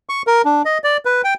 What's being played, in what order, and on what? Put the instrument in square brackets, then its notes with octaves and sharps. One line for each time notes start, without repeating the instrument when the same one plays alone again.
[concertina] C#6
A#4
D4
D#5
D5
B4
G5